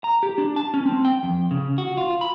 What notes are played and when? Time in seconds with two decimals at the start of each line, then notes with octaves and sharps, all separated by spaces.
0.04 A#5
0.23 G4
0.38 D4
0.56 A5
0.74 C#4
0.86 C4
1.05 G5
1.23 F2
1.51 C#3
1.78 F#4
1.97 F4
2.21 B5